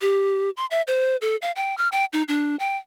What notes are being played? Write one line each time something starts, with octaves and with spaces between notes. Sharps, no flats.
G4
C6
E5
C5
A4
F5
G5
F6
G5
D#4
D4
G5